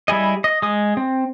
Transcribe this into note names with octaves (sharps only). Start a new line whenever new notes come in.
G3 E4 G#4 D#5
D#5
G#3 D#6
C4